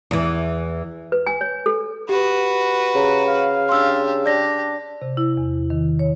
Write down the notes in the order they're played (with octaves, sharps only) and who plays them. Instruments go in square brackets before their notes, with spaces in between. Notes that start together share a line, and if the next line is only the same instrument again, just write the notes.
[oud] E2 E3
[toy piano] B4
G#5
C#5
A4
[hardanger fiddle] F#4 B4 [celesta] G4
[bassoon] C#3 [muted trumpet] A#5
[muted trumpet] F5
[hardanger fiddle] D4 G4 [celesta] C6 E6
[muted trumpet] D4 [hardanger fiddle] G4 [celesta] D5 A#6
[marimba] C3
E4
E2
D#3
C#5